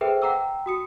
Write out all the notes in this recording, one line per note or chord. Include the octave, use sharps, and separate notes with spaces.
G#4 A4 B4 C5 E5 G5
F#5 G5 A#5 D6 E6
F#4 D#6 C#7